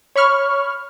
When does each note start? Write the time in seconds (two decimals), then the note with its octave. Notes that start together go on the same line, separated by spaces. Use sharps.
0.16 C#5 B5 C#6 F6